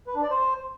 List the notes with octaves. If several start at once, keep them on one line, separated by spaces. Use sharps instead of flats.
B4
D4
D5
C5